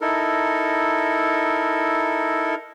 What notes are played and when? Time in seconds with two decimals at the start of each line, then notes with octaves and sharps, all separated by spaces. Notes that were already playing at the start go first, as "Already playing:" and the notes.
0.01 D#4 E4 A4 A#4